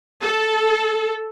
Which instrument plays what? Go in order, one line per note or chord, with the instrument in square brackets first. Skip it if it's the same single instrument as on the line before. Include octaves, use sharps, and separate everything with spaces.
[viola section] A4